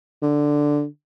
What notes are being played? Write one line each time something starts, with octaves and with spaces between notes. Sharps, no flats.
D3